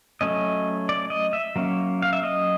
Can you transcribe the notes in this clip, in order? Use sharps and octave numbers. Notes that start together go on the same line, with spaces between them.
F#3 A3 C#4 D#5
D5
D#5
E5
F#3 A#3 C#4
F5
E5
D#5